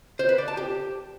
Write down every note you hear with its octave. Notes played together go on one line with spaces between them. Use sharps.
C5
B4
D5
A5
G4